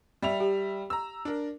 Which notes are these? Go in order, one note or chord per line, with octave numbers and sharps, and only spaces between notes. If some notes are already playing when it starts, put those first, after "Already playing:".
G3 E5 F7
G4
A#5 E6
D4 A#4